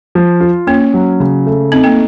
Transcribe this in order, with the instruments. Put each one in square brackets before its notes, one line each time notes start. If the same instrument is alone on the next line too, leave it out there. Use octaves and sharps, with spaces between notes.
[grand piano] F3
F4
[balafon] A#3 [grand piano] C#4
[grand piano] F#3
C#3
A3
[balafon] C4 [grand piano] D#4
[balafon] A#3